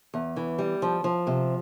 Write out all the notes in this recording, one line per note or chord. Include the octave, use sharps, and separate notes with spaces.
E2
E3
G3
F3
F3
C3